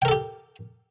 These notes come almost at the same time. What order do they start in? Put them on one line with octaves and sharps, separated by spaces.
G5 A#4 A4 G4